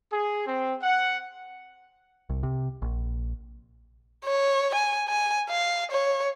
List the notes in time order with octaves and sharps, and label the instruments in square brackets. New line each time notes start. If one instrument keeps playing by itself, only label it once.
[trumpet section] G#4
C4
F#5
[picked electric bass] C2
C3
A#1
[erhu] C#5
G#5
G#5
F5
C#5